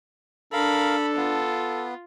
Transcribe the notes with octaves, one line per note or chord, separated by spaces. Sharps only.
D4 A4 A#4 F5 B5
B3 F4